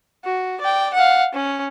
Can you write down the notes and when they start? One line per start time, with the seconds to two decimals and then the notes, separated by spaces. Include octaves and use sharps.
0.24 F#4
0.61 D5 G5
0.94 F5 F#5
1.34 C#4